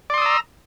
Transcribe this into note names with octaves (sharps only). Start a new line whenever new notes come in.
D5 A#5 C6 D#6 E6